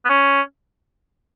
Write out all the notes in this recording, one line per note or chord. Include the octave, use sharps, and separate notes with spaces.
B3
C#4